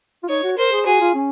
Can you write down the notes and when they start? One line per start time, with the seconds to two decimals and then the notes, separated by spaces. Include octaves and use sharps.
0.23 F4
0.29 D#4 C#5
0.43 F#4
0.57 A#4 C5
0.72 G#4
0.86 F#4 G#4
1.01 F4
1.14 C#4